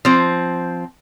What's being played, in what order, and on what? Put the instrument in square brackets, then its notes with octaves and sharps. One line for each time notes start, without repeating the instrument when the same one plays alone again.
[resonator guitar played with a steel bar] F3 C4